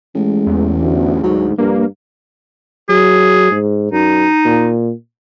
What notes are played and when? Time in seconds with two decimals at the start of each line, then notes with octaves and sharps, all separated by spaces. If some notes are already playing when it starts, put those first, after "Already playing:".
0.15 A1 G#3
0.47 E2
0.81 D2
1.23 D2 G#2 F#3
1.58 A#1 G2 A#3
2.89 F#3 G#4
3.51 G#2
3.92 F#2 D#4
4.45 A#2